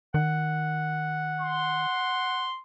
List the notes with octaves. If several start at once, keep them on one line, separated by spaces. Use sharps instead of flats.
D#3 F#5
C6